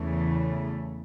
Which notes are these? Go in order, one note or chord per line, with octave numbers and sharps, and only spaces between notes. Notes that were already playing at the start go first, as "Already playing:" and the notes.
Already playing: E2 C#3 E3 A3